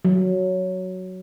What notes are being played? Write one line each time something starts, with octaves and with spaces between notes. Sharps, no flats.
F#3